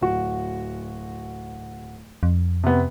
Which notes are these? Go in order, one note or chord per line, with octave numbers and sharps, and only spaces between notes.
D1 F#4
F2
C3 B3